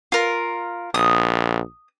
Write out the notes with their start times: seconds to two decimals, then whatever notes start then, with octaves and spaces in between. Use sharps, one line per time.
0.12 F4 A#4
0.94 A#1 D#6